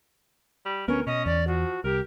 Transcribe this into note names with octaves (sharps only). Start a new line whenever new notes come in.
G3
D2 B3 C#4 A#4
B2 C#4 D#5
E2 D5
F3 F#4
C2 G4 A#4